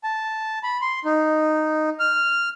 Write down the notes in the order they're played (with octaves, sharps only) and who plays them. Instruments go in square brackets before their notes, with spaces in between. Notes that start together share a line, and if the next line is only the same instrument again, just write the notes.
[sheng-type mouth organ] A5
B5
C6
D#4
F6